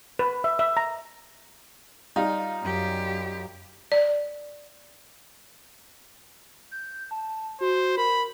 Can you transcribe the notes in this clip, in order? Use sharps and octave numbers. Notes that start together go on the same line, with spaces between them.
B4
E5
E5
A#5
G3 D#4 F4
F#2 G4
D5
G6
A5
F#4 C5
A#4 B5